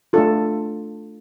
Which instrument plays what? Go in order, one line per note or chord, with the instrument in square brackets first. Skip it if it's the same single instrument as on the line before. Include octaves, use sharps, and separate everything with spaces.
[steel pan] A3 D4 F4 A4